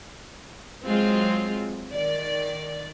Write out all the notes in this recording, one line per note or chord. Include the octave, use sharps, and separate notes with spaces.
F#3 G#3 C4 F4
D#3 D5